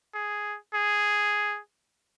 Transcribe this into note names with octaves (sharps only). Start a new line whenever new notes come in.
G#4
G#4